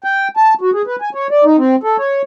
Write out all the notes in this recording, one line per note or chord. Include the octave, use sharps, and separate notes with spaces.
G5
A5
F#4
G#4
B4
G#5
C#5
D5
D#4
C4
A4
C#5